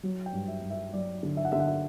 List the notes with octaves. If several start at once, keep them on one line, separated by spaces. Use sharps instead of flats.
F#3
G5
G2
E5
G2
E5
F#3 D5
D3
E5
F#5
D3 E5
F#5
E5